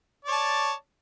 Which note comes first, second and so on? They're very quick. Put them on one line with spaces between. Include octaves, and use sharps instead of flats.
D5 C#5 A5